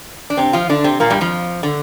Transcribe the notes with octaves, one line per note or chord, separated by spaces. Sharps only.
D4
C3 C4
F3 F4
D3 D4
C3 C4
A#2 A#3
G2 G3
F2 F3
D3